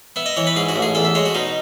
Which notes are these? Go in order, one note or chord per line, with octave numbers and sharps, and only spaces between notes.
B3 E5
D#5
E3 C#5
B4
G#2 G#4
F#4
A1
G#4
E2 A4
E5
G#3 C#5
F#4
B2 D#4